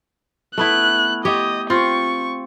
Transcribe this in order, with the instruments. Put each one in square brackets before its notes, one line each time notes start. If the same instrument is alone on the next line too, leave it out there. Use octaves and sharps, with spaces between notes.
[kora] A3 B3 E4 [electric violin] F#6
[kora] G4 C#5 G5 [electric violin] D#5
[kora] C4 F4 [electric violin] C#6